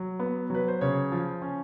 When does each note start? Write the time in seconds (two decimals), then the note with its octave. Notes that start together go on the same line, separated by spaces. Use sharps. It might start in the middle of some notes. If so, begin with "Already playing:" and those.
Already playing: F#3
0.19 B3
0.50 F#3 B4
0.68 C5
0.81 C#3 C#5
1.12 F3
1.42 C#4